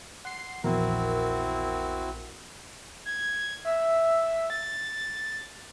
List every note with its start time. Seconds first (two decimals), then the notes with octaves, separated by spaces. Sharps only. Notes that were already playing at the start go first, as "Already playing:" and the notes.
0.25 F#5 C6 C7
0.64 A#1 E2 C4 E4 F#4 A#4
3.05 G#6
3.65 E5
4.50 A6